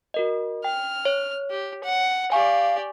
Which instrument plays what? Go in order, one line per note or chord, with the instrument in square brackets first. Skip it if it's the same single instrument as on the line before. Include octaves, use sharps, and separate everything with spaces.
[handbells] F#4 A#4 D#5
[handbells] G5 [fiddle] F6
[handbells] C#5
[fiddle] G4
F#5
[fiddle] G4 D5 [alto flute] F5 [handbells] G#5 C#6